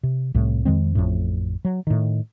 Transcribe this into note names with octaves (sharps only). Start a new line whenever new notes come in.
C3
C2 A2
F2 D#3 G#3 C4
A1 F2 A2
F#3
A2 D#3